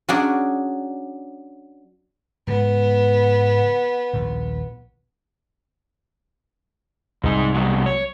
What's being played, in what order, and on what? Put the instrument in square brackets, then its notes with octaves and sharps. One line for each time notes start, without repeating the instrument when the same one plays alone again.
[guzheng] F#3 C#4 D4 F#4 G#4 D5
[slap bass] G#2 C#3 G#3 [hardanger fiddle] B3
[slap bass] A#1 D#2 A#2
[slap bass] C2 [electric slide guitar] G#2 D#4
[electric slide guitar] G2 B2 F#3
C#5